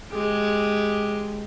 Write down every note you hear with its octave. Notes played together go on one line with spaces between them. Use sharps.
G#3 G4